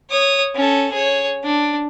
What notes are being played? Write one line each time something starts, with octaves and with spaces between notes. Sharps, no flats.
C#5 D#6
C#4 A4
G#4 C#5
D4